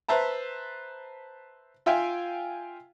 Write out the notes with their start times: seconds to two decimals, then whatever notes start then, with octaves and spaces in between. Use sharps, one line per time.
0.09 B4 C5 E5 A5 A#5
1.86 F4 E5 F5 G5 G#5